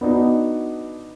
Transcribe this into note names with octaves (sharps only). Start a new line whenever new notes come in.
B3 D4 D#4 F#4